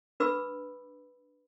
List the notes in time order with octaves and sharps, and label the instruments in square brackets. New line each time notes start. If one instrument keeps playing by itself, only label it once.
[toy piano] D4 B4 B5 D6 E6